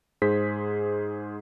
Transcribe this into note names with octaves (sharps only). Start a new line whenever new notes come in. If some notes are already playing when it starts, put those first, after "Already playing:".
G#2 G#4 C5 B6